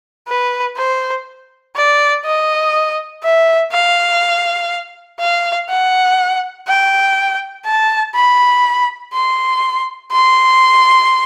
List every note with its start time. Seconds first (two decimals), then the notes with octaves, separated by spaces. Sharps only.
0.28 B4
0.77 C5
1.76 D5
2.25 D#5
3.23 E5
3.72 F5
5.20 F5
5.69 F#5
6.67 G5
7.65 A5
8.15 B5
9.13 C6
10.12 C6